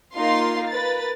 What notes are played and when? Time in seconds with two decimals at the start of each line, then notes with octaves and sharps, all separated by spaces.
0.15 A#3 D#4 F4 F5 C6
0.69 A#4 B4 A6